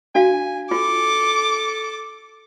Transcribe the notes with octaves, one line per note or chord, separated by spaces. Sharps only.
D4 F#4 F5 G#5
F4 A4 D6